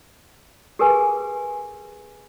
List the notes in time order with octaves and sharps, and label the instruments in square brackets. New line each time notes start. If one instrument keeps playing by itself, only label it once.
[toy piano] G4 G#4 A#4 B4 G#5